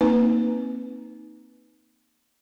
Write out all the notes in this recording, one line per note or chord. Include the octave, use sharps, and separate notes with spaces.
A#3 C4 D#4 B4